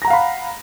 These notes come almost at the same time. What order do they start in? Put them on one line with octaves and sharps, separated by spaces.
A#6 A#5 F#5 F5 B5